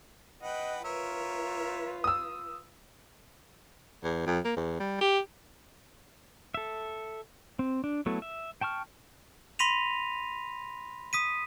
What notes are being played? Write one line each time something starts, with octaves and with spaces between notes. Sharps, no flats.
B4 D#5 F#5 G5
F4 A#4 B4 C#5 E5
D#6 E6
E2
F2
A#3
E2
G3
G4
A4 E5
C4
D4
F#3 A3 B3 E4 A4
E5
G5 A5 C#6 F6
B5 C6 A#6 B6 D#7 F7
D#6 B6 D#7